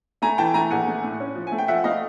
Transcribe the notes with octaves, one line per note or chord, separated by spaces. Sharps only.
A3 G#5 A#5
E3 G5 A5
A3 G#5 A#5
A#1 F#5 G#5
A3
A2
C#4
F3
A3 G#5
G5
F3 E5 F#5
A3 D#5 F5